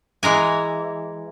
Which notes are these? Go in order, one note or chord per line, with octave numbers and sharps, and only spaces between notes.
E3 G#3 A#4 G#5